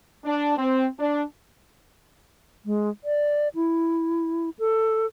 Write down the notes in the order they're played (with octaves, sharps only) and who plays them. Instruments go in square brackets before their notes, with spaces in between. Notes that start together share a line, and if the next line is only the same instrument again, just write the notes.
[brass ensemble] D4
C4
D4
[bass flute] G#3
D5
E4
A4